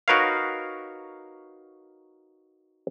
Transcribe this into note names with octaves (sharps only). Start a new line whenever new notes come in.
D#4 F#4 A#4 B4 C#5 F5